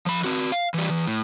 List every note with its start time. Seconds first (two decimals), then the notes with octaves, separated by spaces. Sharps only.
0.06 F3 B5
0.24 C4 F#4
0.52 F5
0.74 E3 G3
0.90 E2
1.07 A2